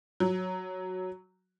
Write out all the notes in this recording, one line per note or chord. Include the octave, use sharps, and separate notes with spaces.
F#3